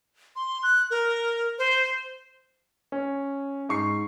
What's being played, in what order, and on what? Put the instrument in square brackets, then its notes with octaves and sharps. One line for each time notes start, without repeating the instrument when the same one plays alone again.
[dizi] C6
F#6
A#4
C5
[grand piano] C#4
G#2 C#6 C7